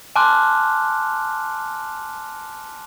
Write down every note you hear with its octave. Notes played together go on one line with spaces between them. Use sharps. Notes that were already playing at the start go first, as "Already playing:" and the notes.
G#5 A5 C6 D6 F6 F#6